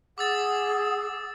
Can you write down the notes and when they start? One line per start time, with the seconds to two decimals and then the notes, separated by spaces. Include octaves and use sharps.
0.18 G#4 F#5 D6 E6 A6